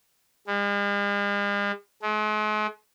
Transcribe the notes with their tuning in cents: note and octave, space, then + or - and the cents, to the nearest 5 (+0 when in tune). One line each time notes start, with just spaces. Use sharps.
G#3 -45
G#3 +45